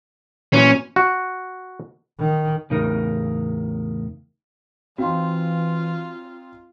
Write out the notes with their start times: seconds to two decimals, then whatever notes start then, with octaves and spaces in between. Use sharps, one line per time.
0.53 A#2 E3 F#3 C#4
0.96 F#4
2.19 D#3
2.70 E2 A2 C#3 D#4 A#4
4.98 E3 C4 D#4 F4 F#4 F5 C6